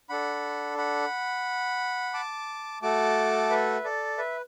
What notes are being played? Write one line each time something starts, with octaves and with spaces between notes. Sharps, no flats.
D4 A4 F#5 B5
F#5 B5
A5 D6
A3 F#4 A4 A5 D6
B4 E5
A4 D5
B4 E5